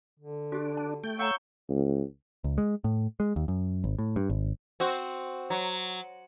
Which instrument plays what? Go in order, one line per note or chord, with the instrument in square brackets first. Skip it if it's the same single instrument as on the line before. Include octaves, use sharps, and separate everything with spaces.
[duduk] D3
[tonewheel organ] D4 [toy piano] F#4 G4
[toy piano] A5
[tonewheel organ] A3 G5
[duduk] C#5 [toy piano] F5 F#5 A#5 [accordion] C#6 E6 G6
[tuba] C#2
[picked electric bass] C#2
G#3
A2
G#3
D#2
F#2
G#1
A2
G2
G#1
[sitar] C4 F#4
F#3